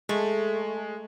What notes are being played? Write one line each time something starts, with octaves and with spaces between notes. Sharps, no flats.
G#3 A3